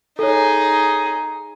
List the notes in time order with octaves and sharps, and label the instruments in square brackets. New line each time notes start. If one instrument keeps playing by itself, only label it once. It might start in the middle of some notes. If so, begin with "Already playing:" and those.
[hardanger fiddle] D#4 G#4 [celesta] A4 C#5